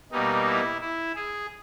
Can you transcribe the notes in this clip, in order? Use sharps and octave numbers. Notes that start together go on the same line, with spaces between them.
B2 G3 A#3 D#4
E4
E4
G#4